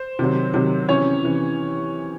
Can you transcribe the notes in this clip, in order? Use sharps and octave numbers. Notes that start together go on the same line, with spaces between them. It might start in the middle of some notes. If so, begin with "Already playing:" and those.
Already playing: C5
C3 D#3 F#3
C3 D#3 F#3
C3 E3 C#4 C#5
C3 E3